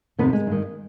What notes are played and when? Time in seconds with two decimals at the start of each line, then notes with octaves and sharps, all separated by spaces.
0.18 F2 C3 D#3 B3
0.33 G#3
0.47 G2 D#3